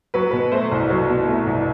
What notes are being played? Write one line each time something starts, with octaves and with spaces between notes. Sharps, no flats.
F#3 B4
B2 B4
A3 C5
C2
F#3
B2
A3
C2